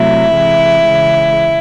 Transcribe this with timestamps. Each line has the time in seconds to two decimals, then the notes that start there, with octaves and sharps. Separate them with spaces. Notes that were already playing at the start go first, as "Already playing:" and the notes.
Already playing: C3 F#3 A3 E4
0.33 C3 E3 G#3
0.84 C#3 E3 G#3